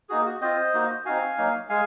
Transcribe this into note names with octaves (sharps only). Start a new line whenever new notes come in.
A#3 D#4 F#4 G#4
F#4
C4 F4 C5 D#5
A#3 D#4 F#4
C4 D#4 F#4 F5 G#5
F#3 A#3 D#4
G#3 F5 G#5